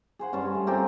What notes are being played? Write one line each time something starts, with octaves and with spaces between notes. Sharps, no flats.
G#4 C5 F#5
G2 C#4 G#4 A5
A3
C4 F4 G4 A#4